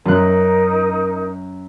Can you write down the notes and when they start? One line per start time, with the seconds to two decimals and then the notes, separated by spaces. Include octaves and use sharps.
0.06 F#2 D#4 A#4 F#6